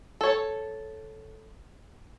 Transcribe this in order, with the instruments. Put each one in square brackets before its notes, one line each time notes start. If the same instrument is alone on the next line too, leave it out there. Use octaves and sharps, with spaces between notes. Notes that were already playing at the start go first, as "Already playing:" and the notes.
[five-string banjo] A4 C#5